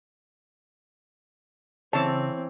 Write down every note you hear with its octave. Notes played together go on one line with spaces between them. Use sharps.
C#3 E3 C4 C#5 A5